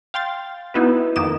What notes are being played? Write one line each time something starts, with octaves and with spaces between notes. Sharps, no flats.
F5 G5 C6 A6
B3 D#4 E4 F#4 B4
F2 D#3 A#3 D#5 D6 E7